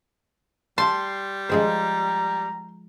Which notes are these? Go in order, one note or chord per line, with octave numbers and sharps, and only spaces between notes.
G3 A5 C6
F3 G#3 C5 A#5